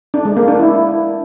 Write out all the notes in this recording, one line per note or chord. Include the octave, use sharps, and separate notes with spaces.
D4
G#3
A#3
D4
E4